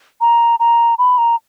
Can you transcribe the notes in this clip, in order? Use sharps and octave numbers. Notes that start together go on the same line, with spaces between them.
A#5
A#5
B5
A#5